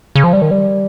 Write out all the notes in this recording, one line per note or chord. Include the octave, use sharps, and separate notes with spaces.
C#3
F3
G3
D#3
G3